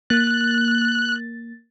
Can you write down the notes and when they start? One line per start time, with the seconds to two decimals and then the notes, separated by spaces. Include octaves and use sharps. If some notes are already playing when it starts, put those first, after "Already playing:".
0.10 A#3 F#6 A6